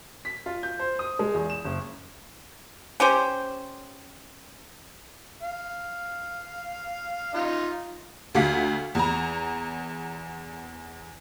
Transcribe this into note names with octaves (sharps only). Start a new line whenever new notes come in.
B6
F4
G6
C5
D#6
G#3
E2
E7
F#1
C#4 G4 C5
F5
D#4 F4
D2 F#4 F5 B6
E2 A#5